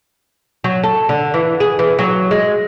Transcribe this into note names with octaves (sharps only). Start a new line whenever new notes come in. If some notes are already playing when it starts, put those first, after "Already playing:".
F#3
A4
D3
E3
G#4
E3
F#3
G#3